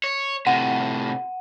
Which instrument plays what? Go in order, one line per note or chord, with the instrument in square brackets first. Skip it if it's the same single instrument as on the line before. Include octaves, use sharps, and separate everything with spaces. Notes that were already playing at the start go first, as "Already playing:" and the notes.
[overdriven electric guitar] C#5
[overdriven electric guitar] A2 C3 [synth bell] F#5